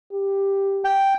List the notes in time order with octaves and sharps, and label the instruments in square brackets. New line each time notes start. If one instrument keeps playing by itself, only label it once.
[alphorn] G4
[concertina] G5